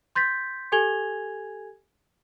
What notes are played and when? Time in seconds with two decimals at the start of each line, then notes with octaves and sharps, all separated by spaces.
0.15 C6 G6 A6 B6
0.72 G4 A4 G#5 G#6 F7 G7